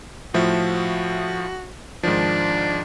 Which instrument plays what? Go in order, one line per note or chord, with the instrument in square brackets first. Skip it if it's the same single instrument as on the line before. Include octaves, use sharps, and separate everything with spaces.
[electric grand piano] A2 F3 E5 [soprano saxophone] F#4
[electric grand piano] G#2 D#3 F3 [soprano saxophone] D4